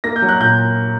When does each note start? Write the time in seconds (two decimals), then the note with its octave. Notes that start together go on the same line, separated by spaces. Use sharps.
0.04 A#3 A#6
0.16 G6
0.22 F#3
0.29 F#6
0.40 A#2 G6